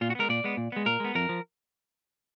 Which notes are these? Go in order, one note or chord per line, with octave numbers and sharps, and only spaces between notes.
A#2 F4
F#4
G#3 B3 A#4
A#2 D5
G#3 B3
A#2
G#3 B3
A#2 A#4
G#3 B3
F2 A#4
F3